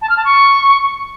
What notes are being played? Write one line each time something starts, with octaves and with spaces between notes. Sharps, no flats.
A5
F6
A5
C#6